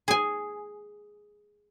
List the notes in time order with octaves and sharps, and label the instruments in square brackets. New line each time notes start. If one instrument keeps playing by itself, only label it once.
[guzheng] G#4 G#5